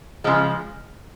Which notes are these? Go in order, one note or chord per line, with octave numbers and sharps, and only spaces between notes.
C#3 F3 G#3